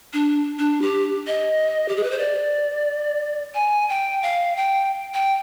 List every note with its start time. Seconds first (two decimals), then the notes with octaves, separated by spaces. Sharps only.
0.13 D4
0.59 D4
0.82 G4
1.27 D#5
1.89 G4
1.97 G#4
2.03 B4
2.11 C5
2.19 D5
3.55 G#5
3.89 G5
4.23 F5
4.57 G5
5.14 G5